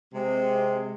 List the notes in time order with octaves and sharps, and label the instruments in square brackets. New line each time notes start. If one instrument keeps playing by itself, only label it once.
[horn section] C3 G#3